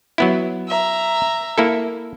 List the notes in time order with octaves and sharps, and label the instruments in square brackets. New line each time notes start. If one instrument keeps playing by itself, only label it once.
[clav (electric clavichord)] F#3 B3 E4
[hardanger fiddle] E5 A#5
[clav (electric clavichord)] A#3 E4 A4